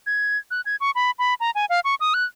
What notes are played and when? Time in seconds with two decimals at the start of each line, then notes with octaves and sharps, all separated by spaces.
0.07 G#6
0.51 F#6
0.66 G#6
0.81 C#6
0.95 B5
1.19 B5
1.40 A#5
1.55 G#5
1.70 F5
1.84 C#6
2.00 D#6
2.14 F#6